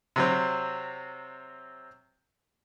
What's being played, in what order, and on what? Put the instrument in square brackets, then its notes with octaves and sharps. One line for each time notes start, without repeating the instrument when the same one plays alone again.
[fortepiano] C3 F#3 C4